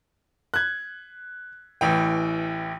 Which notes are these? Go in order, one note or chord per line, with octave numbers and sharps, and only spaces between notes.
F#6 G#6
A1 E3 G5